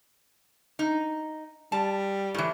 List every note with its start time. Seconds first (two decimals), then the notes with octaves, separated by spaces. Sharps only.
0.79 D#4
1.72 G3 A5
2.34 A2 E3